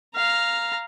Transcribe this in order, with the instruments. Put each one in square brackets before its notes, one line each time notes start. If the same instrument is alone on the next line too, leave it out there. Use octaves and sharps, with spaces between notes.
[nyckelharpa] F5 A#5